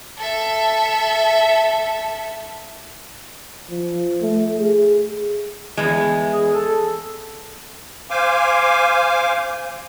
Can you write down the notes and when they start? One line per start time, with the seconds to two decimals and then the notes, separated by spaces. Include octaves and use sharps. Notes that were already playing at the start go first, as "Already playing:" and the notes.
0.18 A4 E5
3.70 F3
4.22 A3
4.60 G#4
5.77 E2 G#3
6.33 G#4
6.54 A4
8.10 C5 F5 G#5 D6